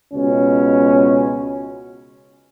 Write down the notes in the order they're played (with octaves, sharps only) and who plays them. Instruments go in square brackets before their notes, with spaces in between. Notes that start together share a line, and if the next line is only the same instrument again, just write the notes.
[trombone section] C#2 B2 C#4